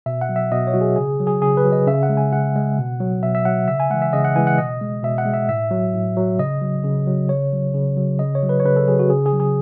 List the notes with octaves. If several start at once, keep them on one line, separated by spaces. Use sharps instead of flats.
B2 E5
F#5
F#3
E5
B2 D#5
C#5
F#3 F#4
G#4
C#3 G#4
F#3
G#4
C#3 G#4
B4
F#3
D#5
C#3 E5
F#5
G#3
G#5
C#3 F#5
G#3
B2
F#3
B2 E5
E5
F#3 F#5
C#3 E5
G#5
E3 G#3 F#5
E5
C#3 D#5
F#5
E3 G#3 G#5
F#5
B2 D#5
G#3
B2 E5
F#5
G#3
E5
A2 E5
F#3
A2
F#3
C#3 D#5
F#3
C#3
F#3
C#3 C#5
F#3
C#3
F#3
C#3 D#5
C#5
F#3
B4
C#5
C#3 B4
A4
F#3 G#4
F#4
C#3 G#4
G#4
F#3
G#4